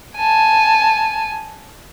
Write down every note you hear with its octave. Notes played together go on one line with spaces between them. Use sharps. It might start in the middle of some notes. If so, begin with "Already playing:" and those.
G#5 A5